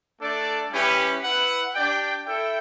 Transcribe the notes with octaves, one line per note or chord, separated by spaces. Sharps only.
A3 D4 A4 D5
G3 C#4 E4 G4 B4
E4 B4 F#5
D4 G4 D5 G5
E4 A4 E5 G5